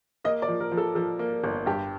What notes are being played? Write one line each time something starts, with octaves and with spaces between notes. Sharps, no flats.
A#3 D#5
D5
F3
A#4
F3
A4
F3 A4
A#3
G1
G2 G4